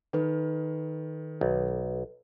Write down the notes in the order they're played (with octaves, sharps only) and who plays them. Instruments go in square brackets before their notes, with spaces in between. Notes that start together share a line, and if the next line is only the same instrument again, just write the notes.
[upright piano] D#3 [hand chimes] A4 B4
[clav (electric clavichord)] B1